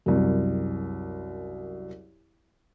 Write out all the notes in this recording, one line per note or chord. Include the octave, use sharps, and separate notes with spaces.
C2 F#2